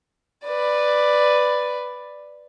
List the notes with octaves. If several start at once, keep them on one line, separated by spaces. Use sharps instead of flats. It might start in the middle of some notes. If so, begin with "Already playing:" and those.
B4 D5